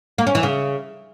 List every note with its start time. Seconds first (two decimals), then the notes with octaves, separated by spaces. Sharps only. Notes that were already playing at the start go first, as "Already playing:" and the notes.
0.18 A#3
0.27 C#4
0.35 E3
0.43 C#3